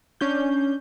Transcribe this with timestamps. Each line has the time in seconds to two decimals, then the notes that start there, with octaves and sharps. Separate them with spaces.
0.21 C#4 D4 G6